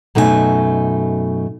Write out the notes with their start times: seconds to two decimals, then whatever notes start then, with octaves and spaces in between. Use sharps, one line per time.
0.15 F#2 B2 A3 D#4 G#4 G#5